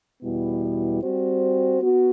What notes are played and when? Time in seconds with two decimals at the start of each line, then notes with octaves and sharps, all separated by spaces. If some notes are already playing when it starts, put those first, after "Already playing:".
0.21 E2 B2 G3 B3 E4
1.02 G3 C4 F#4 C5
1.82 B3 F#4